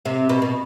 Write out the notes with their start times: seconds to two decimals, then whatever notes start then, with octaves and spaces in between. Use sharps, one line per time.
0.05 C3
0.29 B2
0.42 B2